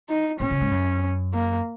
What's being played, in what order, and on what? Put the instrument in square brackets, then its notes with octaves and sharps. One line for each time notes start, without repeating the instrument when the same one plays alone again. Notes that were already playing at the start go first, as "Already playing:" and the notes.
[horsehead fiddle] D#4
[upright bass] A#2 [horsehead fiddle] C#4
[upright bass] C#3
G#2
F#2
[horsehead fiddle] A#3